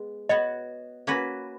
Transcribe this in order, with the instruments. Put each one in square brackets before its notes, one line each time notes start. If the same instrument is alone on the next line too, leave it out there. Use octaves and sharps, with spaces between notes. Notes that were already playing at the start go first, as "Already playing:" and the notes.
Already playing: [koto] G#3 B3
[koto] B3 F#4 C#5 [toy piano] D#5
[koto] A#3 C#4 F#4 B4